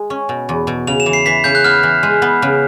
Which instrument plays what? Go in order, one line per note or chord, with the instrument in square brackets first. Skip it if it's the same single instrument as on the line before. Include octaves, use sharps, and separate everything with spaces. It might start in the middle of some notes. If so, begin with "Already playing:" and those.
Already playing: [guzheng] G#3
C#4
B2
E2
B2
[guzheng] C#3 [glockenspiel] F7
[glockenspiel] E7
[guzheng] E3
[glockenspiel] C7
[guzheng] E3 [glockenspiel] B6
[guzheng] C#3 [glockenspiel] G6
[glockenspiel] F#6
[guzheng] B3 [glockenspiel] F6
[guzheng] E3
G#3
B3
C#3